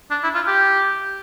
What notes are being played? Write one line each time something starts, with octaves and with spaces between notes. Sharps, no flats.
D4
E4
F4
G4